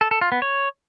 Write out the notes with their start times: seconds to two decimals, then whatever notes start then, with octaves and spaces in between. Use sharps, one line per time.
0.01 A4
0.11 A4
0.21 F4
0.32 B3
0.42 C#5